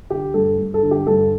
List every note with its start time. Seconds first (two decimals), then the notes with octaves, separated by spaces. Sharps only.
0.10 D3 G4
0.34 G2 A4
0.58 G2
0.74 A4
0.83 D3
0.91 G4
1.07 G2 A4